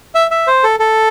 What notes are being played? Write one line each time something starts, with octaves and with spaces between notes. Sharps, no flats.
E5
E5
C5
A4
A4